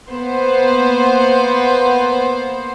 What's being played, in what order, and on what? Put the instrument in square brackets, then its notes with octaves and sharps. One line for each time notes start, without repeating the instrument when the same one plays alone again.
[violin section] A#3 B3 C5